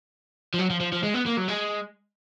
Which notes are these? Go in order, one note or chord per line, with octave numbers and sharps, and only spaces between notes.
F3
F#3
F3
F3
F3
G#3
B3
A#3
F#3
G#3